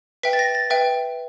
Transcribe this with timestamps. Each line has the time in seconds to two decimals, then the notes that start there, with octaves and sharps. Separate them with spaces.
0.23 B4 E5 G5 B6
0.33 A6
0.39 A#6
0.55 A6
0.70 B4 E5 G5